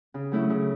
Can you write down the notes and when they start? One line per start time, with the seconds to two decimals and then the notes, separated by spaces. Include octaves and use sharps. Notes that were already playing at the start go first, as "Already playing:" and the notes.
0.14 C#3
0.32 F#3 A3 C#4 E4
0.50 C#3